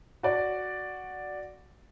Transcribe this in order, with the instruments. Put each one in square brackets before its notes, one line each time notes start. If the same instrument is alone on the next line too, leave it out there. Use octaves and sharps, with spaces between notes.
[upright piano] F#4 D5